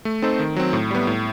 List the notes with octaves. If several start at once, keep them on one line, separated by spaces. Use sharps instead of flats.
A3
C4 D#4 A4 C5
D#3
F#3 C4
A2
G3 B3
A2